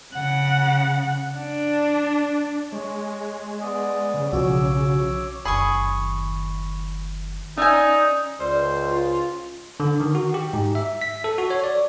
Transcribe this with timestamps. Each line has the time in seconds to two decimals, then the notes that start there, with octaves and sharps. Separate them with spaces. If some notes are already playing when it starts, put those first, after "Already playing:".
0.14 C#3 F#5
1.37 D4
2.72 G#3 C#5
3.62 B3 D5 D#6
4.14 C#3
4.33 B1 F3 F#4 C#5 D6 E6
5.45 F#1 D#3 G#4 B5 C#6
7.58 C#4 D#4 D5 E5 G#5
8.40 C#2 B4 C5 D5 E6
8.91 F4
9.80 D3
10.00 D#3
10.15 F#4
10.34 G4
10.53 G#2
10.75 E5
11.02 B6
11.24 A4
11.38 F#4
11.50 C#5
11.64 D5